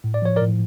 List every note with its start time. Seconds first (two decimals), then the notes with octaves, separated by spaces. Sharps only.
0.04 A2
0.14 D5
0.22 F3 C#5
0.36 A#4 D5
0.41 A2